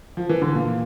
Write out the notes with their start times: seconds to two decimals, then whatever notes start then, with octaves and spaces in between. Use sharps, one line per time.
0.17 F3
0.29 E3
0.42 D3
0.54 A#2